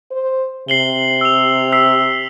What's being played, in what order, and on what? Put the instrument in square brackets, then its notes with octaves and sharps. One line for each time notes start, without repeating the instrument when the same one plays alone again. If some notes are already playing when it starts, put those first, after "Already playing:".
[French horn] C5
[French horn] C3 [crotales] C7 F#7 G7
[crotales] E6 F7
E6 B6 C7